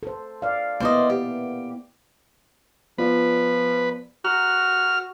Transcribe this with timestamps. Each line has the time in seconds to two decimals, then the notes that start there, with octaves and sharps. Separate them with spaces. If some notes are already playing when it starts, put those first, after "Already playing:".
0.03 A4 C5
0.42 D5 F5
0.80 A#3 B3 E4 C5 D5 D#5
1.10 G4
2.98 F3 B3 F4 B4 D5
4.25 F#4 A#5 F6